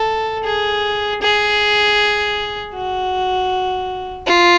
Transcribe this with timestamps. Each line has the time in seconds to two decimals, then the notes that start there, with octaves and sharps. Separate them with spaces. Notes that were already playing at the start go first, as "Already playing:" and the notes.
Already playing: A4
0.44 G#4
1.22 G#4
2.74 F#4
4.26 F4